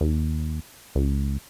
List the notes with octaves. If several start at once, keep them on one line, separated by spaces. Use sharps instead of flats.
D#2
C#2